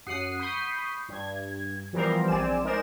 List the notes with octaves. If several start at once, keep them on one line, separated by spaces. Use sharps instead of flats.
F#2 F#5 D#6 C7
B5 C#6 D#6 G6 C7
G2 G#6
E3 F3 G3 B3 A#4 C5
A#1 C4 D5 G#5 E7
G#3 D#4 A#4 C5 D5 E7